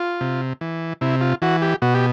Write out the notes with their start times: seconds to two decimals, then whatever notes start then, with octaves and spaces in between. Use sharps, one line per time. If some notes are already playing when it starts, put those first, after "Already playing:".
Already playing: F4
0.21 C3
0.61 E3
1.01 C3 E4
1.21 F4
1.42 E3 F#4
1.62 G4
1.82 B2 F#4
1.94 G4